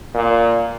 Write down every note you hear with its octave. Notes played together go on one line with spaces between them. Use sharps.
A#2